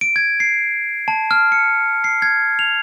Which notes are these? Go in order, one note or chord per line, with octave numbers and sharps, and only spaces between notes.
D7
G#6
C7
A5
F6
C#7
C7
G#6
F7